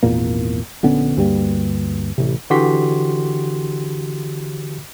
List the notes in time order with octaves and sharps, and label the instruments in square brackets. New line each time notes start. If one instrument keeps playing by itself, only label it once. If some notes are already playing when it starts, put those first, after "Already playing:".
[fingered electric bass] G#1 E2 A#2 A#3
A#1 D3 B3 C#4
D2 G2 G3 A#3
A1 C3
[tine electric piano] D3 E3 F#4 G4 C6 B6